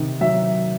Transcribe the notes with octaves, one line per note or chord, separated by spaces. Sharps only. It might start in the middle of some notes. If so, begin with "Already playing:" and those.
Already playing: C3 D#3
F#3 E5